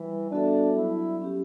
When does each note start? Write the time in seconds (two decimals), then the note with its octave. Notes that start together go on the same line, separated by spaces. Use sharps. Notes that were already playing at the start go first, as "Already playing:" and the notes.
Already playing: E3 G3
0.31 B3 D4 F#4 A4 E5
0.76 F#3 E4
1.21 C#4 G4